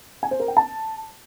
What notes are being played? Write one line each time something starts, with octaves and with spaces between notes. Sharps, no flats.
G#5
C5
A#4
G5
A5